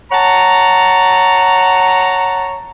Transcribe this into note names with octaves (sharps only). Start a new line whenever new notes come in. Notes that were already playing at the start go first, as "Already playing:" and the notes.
C#5 F#5 A5 A#5